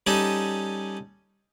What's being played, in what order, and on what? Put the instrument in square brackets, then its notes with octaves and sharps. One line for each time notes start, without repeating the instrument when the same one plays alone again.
[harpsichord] G3 C#4 D#4 A4